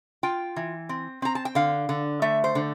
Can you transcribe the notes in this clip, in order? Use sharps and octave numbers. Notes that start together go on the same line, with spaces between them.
F4 G5
E3
C4
C4 A#5
A5
G5
D3 F5
D3
A3 E5
C5
D3